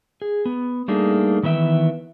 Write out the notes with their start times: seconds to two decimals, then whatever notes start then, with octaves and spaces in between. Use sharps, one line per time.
0.22 G#4
0.45 B3
0.88 G3 A3 A#3 D4 D#4 G#4
1.43 D#3 E3 B3 E5 G5